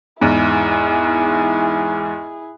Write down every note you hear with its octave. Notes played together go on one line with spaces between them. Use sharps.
E2 G#2 E4 G#4